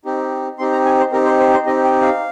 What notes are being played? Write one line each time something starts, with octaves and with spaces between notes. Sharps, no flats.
C4 D#4 G4
C4 D#4 G4 C6
A#5
G#5
C5
C4 D#4 G4 A#4
C5
C5
C5
C4 D#4 G4 D#5
G5
F5